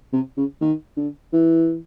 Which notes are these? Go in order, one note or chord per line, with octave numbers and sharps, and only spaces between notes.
C3
C#3
D#3
D3
E3